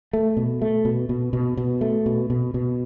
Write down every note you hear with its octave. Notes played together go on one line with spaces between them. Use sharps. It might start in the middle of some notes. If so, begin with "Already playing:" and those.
A3
B2
A3
B2
B2
B2
B2
A3
B2
B2
B2